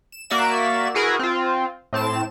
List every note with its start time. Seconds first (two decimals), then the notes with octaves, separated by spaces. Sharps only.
0.12 E7
0.30 A#3 F#4 D5 E5 E7
0.94 E4 F#4 G#4 A#4 B4
1.19 C4 F4
1.93 A2 C4 A5 E7